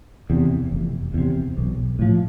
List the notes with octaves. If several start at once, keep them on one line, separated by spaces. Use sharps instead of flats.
E2 C3
F1
E2 C3
B1
A2 F3